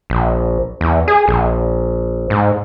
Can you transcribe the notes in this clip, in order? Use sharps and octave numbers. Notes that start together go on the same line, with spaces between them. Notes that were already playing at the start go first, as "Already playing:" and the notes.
A#1
E2
G#4
A#1
G#2